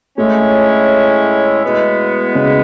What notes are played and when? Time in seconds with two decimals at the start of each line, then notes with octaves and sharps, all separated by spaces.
0.17 A2 G#3 A3 C#4 E4
1.63 B2 G#3 B3 E4
2.35 C#3